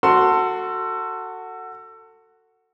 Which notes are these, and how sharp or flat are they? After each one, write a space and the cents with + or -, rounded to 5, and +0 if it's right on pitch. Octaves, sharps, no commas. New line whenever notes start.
F#4 +0 A4 +25 C6 +0